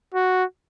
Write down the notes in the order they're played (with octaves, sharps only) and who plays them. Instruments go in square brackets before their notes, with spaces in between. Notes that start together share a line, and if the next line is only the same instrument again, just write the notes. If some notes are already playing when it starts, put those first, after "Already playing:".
[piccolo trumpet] F#4